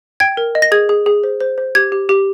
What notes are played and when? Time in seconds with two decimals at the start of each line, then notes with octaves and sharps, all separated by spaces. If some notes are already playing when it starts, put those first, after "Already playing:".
0.20 G5 G#6
0.37 A#4
0.55 D#5
0.62 A#6
0.72 G#4 G#6
0.89 G#4
1.06 G#4
1.24 C5
1.41 C5
1.58 C5
1.75 G4 G#6
1.92 G4
2.09 G4